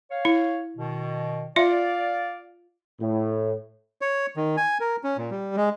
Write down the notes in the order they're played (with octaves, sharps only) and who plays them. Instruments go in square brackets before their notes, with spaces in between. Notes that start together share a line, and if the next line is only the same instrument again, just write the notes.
[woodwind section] C#5 F5
[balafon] E4
[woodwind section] B2 D#3
[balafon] F4 E5 [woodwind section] D5 F5
[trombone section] A2
[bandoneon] C#5
D#3
G#5
A#4
C#4
A#2
G3
G#3